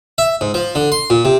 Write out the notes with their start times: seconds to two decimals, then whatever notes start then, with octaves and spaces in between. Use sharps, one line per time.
0.18 E5
0.41 G#2
0.54 F3
0.75 D3
0.92 C6
1.10 A#2
1.25 C3